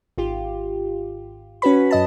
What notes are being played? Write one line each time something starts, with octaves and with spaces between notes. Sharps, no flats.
G#1 F4 G4
C#4 F#4 B4 B5
F#2 D#5 A5